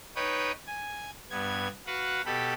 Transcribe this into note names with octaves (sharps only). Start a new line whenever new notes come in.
D#4 B4 C#5 G5 D#6
G#5
G2 B3 G#6
F#4 B4 F5 F#5
B2 G4 A4 B5